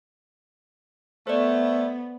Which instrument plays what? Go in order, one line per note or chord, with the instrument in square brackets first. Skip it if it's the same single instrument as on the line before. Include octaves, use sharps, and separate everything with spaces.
[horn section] A3 [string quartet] B3 [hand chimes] C5 D5